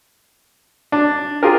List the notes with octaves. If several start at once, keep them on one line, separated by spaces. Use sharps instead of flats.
D4
F4 G4 G#4 A#4